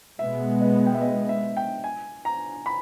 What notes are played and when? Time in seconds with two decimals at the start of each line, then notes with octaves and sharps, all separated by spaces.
0.19 B2 G#3 B3 E5
0.61 D#5
0.87 G5
0.94 E5
1.01 D#5
1.29 E5
1.57 G5
1.84 G#5
2.25 A#5
2.66 B5